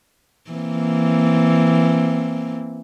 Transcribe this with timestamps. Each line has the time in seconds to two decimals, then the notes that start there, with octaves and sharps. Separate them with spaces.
0.51 E3 A#3 C4